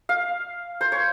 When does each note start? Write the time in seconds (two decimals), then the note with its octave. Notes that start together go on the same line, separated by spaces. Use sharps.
0.09 F5
0.81 C5
0.92 C#5